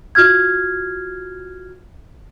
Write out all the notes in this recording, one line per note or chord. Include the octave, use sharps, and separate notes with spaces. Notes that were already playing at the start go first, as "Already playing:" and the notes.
F4 F#4 F6 G#6